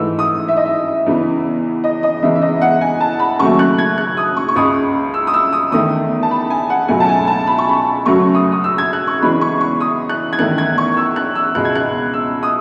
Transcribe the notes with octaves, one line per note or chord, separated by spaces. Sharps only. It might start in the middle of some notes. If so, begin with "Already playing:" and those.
Already playing: G#2 E3 A3 E6
D#6
E5
D#5
E5
E2 C#3 E3
D#5
D#5
E2 C#3 E3 G#3 E5
E5
D#5
F#5
G#5
A5
B5
D#2 C#3 F#3 A3 C#6
F#6
G#6
F#6
D#6
C#6
C#6
C#2 C#3 G#3 D#6
E6
D#6
E6
D#6
E2 D#3 A3 D#6
A5
B5
G#5
F#5
C#2 B2 F#3 A3 G#5
A5
G#5
A5
B5
C#6
B5
F#2 C#3 F#3 A3 C#6
D#6
D#6
E6
G#6
F#6
C#6
E2 C#3 E3 G#3 B5
C#6
C#6
D#6
F#6
G#6
E2 D#3 A3 F#6
G#6
C#6
E6
F#6
E6
C#2 B2 G#3 F#6
G#6
F#6
E6
D#6